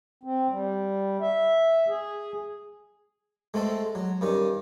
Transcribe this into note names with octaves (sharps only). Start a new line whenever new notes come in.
C4
G3
E5
G#4
G#3 A3 C4 A4
F#3
G2 D#3 C#4